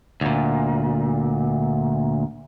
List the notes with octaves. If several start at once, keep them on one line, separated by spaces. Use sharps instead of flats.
D2 A#2